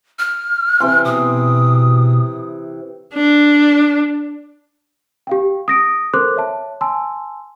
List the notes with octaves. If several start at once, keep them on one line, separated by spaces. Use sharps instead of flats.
F6
C3 E3 C6
B2 D#6
D4
G4 F5 G5
D#6 A#6 D7
A4 A#4 C5 C6 D6 F#6
C#5 E5 A5
G#5 A5 C6 E6